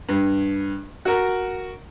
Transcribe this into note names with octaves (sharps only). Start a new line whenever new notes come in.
G2
F#4 A#4